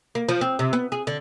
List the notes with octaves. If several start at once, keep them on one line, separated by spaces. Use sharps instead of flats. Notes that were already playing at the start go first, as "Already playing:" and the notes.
A#3
F3
C4
C3
B3
G#4
D3